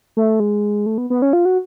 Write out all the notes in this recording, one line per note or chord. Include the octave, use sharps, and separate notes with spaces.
A3
G#3
A3
B3
B3
C#4
F4
F#4